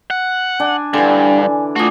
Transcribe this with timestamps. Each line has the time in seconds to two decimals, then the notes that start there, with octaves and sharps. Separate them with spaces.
0.10 F#5
0.60 D4 G#5
0.94 G2 D3 E3 G#5
1.76 A3 F4 F#4 G#4 D6